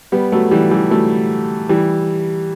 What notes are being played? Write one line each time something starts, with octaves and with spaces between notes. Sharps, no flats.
G3 B3
F#3 A3
E3 G3
E3 G3
F#3 A3
E3 G3